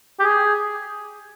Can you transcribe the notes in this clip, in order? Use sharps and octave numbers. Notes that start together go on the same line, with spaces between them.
G4
G#4